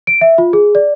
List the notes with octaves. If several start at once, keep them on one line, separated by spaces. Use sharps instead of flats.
D7
E5
F4
G#4
D5